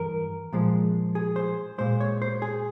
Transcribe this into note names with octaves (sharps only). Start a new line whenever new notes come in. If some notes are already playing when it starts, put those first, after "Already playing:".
Already playing: G2 E3 A#4
A#2 F3 G#3
G#4
C5
A#2 G#3 C5
C#5
C5
G#4